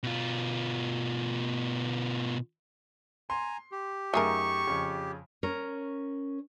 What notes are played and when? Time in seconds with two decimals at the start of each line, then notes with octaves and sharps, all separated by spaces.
0.03 B2 F4
3.30 G#5 A#5 C6
3.72 G4
4.14 F#2 A3 D#4 G#4 A#4 C#6 D#6
4.67 F2 C#3
5.43 C#4 A#4 C#5